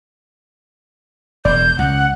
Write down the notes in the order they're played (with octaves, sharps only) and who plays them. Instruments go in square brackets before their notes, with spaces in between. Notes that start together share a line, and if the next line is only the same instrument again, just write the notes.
[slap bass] E1 [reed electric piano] D5 [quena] G6
[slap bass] C#2 [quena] F#5